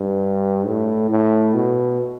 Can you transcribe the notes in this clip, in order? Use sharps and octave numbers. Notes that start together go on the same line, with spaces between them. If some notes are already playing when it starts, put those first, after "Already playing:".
Already playing: G2
A2
A2
B2